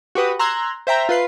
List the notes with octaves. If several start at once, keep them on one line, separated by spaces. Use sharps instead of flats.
F#4 G4 B4 D#6
A#5 C6 E6 F#6 G#6
C5 E5 G5 A#5
F4 B4 C7